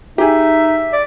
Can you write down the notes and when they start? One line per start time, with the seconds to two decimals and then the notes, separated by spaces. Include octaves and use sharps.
0.18 D#4 G4 G#4 E5
0.93 D5